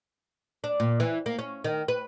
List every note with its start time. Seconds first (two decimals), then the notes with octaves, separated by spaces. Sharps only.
0.64 D4
0.80 A#2
1.00 E3
1.26 A#3
1.39 C#4
1.64 D#3
1.88 B4